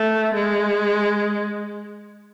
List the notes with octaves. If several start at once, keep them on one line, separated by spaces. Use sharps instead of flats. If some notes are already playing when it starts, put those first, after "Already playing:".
Already playing: A3
G#3